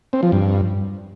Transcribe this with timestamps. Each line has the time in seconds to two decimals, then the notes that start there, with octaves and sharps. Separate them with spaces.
0.13 C4
0.23 F3
0.32 G2